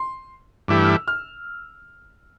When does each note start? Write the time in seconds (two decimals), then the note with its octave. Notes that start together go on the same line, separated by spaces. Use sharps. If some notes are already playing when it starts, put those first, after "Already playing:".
Already playing: C6
0.68 G2 E3 A3 E4 G4 D6
0.84 F6
0.89 E6
1.08 F6